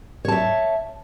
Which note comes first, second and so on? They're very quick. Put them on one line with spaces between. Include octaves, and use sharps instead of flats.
C#5 A5 E5